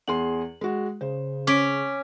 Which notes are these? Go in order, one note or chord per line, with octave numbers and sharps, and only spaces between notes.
E2 G#4 C6 F#7
G#3 F#4
C#3 C5
C#4 D6 B6 D7